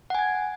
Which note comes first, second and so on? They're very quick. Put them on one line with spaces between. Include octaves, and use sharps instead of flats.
F#5 G#5 G#6